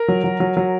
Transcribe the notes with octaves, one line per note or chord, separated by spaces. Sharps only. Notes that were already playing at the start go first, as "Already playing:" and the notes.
Already playing: A#4
F#3
F#3
F#3
F#3